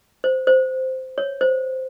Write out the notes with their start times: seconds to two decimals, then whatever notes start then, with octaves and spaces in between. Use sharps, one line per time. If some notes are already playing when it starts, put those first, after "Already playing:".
0.24 C5
0.47 C5
1.18 C#5
1.41 C5